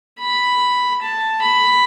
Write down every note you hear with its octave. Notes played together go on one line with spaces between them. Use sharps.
B5
A5
B5